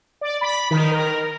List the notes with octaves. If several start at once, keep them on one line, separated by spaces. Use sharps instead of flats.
D5
B5
D#3
A#4